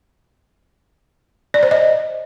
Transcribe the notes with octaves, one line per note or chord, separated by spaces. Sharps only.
D5
C5
D#5